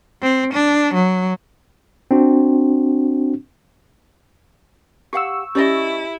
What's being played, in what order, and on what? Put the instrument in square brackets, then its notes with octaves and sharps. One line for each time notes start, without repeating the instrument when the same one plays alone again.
[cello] C4
D4
F#3
[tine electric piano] C4 D4 F#4
[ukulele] G4 F5 F#5 [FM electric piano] C#6 E6
[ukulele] C#4 D5 D#5 [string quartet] E4 [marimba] G4